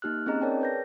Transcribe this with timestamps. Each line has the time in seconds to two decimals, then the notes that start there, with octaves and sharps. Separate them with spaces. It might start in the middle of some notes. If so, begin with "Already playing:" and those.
0.02 A#3 D#4 G4 F6 F#6
0.26 C4 C#4 D#4 G#4 D#5 A#5
0.41 G#4 A#4 C#5 D5 G5 A5
0.61 B4 G6 A#6